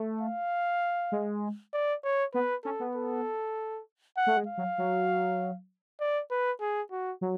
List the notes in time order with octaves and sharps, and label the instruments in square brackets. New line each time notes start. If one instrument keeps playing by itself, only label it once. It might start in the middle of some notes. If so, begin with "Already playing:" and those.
Already playing: [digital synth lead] A3
[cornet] F5
[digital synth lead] G#3
[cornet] D5
C#5
[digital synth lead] B3 [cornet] B4
[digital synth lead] C#4 [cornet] A4
[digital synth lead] B3
[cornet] A4
F#5
[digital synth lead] A3
G#3
[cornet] F5
[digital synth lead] F#3
F#3
[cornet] D5
B4
G#4
F#4
[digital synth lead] F#3